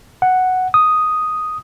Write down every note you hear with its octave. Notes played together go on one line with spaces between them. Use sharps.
F#5
D#6